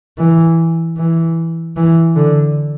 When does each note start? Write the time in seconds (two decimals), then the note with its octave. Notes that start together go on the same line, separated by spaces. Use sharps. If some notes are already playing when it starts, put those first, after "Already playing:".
0.18 E3
0.98 E3
1.77 E3
2.16 D3